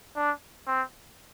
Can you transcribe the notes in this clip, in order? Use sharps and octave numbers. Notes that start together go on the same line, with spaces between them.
D4
C4